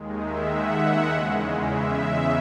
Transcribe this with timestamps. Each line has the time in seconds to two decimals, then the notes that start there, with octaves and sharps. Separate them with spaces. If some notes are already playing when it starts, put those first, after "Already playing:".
Already playing: D#2 D#3 G#3
0.20 E5
0.49 F#5
1.08 E2 C#3 G#3
1.67 E5